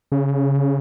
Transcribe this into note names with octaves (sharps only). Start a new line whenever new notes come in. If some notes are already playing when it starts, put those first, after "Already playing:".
C#3